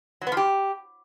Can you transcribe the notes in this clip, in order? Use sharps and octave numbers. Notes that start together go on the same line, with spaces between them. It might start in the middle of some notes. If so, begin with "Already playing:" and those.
F#3
B3
F3
G4